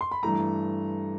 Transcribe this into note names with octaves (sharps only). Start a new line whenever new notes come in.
C6
B5
G2 E3 A3 A#5